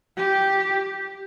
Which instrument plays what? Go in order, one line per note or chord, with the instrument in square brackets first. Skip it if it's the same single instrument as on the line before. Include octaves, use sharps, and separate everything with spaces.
[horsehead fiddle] G4